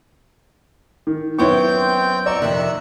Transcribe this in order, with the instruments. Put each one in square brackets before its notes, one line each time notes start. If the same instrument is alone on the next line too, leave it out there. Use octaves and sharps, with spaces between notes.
[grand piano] D#3
[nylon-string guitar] F#2 B3 E4 [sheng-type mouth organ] C4 G5 G6 [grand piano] C#5 C#6
[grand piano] D5 [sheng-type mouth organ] A#5 C#6 E6
[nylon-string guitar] F2 C3 D#3 [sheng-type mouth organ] E5 E6 F#6